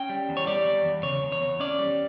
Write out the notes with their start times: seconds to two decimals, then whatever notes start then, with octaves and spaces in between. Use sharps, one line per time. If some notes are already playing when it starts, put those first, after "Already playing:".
Already playing: C#4 G5
0.09 G3
0.29 E2
0.37 C#5
0.47 G3 D5
0.67 E2
0.85 E2
1.03 C#3 C#5
1.23 E2
1.32 C#5
1.41 E2
1.60 C#4 D5
1.79 G3